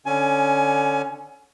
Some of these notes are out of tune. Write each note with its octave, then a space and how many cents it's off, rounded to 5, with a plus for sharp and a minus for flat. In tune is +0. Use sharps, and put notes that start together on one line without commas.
D3 +0 C#4 +0 G#5 +25